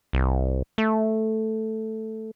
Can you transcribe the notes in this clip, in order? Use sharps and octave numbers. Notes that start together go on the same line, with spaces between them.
C2
A3